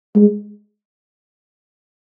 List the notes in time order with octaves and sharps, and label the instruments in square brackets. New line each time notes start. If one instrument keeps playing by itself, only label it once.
[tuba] G#3